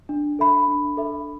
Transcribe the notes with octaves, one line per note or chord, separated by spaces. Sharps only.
D4
A4 E5 B5
D4
A4 E5 B5